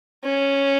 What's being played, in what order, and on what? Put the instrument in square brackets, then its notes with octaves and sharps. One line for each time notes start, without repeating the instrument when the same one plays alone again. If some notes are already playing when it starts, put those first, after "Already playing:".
[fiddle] C#4